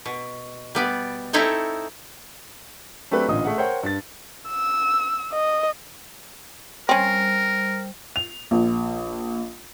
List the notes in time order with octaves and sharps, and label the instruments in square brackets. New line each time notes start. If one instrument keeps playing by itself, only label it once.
[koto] B2
G3 B3 D5
C4 D#4 E4 A4 C5 C#5
[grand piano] F#3 A3 C4 D4 G4 B4
A1 A#2 D3 D#5 D#6
A3 G#4 E5 F#5
A#4 C5 C#5 F#5 G5
G2 A6
[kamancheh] E6
D#5
[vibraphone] G3 C5 [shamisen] C4 C#4 [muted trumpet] A#4
[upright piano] F7
A#1